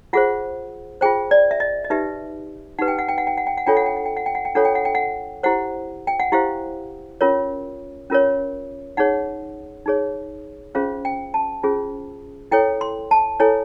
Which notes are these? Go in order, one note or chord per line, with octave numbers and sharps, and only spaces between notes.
F4 G#4 C5 F#5
F4 G#4 C5 G5
D5
E5
D#5
D#5
D#4 G4 B4 E5
D#4 G4 B4 F#5
G5
F#5
G5
F#5
G5
F#5
G5
F#5
D4 F4 A4 C#5 G5
F#5
G5
F#5
G5
F#5
G5
F#5
G5
D4 F4 A4 C#5 F#5
G5
F#5
G5
F#5
E4 G4 C5 F#5
G5
F#5
E4 G4 C5 F5
C#4 F4 A#4 C#5
C#4 F4 A#4 C#5
D#4 G#4 C#5 F#5
D#4 G#4 C#5
C#4 F4 G#4 C5 F5
G5
A5
C#4 F4 G#4 C5
E4 A4 C#5 G5
C6
A5
E4 A4 C#5 G#5